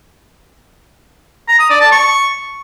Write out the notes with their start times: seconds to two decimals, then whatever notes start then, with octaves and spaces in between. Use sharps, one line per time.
1.48 A#5
1.59 D#6
1.70 D5
1.81 A5
1.92 C#6